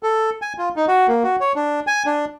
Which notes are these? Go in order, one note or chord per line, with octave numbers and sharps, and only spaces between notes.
A4
G#5
F4
D#4
F#4
A#3
F#4
C#5
D4
G#5
D4